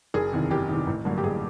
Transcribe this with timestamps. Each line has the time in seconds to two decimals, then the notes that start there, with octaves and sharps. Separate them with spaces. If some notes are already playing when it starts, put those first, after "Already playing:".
0.14 F#1 G#4
0.33 E2 C3 D#3
0.50 F#1 G4
0.69 E2 C3 D#3
0.87 A1
1.05 G2 D3 F#3 A#3
1.18 G4
1.24 A1 G#4